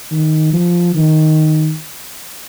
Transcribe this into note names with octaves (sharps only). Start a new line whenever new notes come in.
D#3
F3
D#3